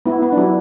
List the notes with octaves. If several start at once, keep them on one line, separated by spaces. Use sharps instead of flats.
B3 E4
B3
D4
F#3 E4